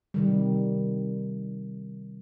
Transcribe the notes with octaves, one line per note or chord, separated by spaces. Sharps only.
C3 D#3 G3